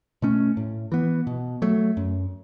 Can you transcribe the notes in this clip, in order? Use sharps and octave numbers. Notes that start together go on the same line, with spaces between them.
B2 A3 C#4
A2
E3 B3
B2
F#3 A3
F#2